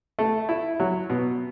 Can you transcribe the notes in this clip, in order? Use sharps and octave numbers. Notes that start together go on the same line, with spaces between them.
A3
E4
F#3
B2